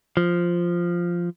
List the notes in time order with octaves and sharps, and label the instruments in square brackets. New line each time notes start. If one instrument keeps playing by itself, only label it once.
[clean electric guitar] F3